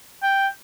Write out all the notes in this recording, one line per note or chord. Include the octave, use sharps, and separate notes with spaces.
G5